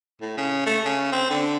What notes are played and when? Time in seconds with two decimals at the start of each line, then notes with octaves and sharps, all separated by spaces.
0.21 A2
0.37 C#3
0.66 A3
0.85 C#3
1.12 C4
1.30 D3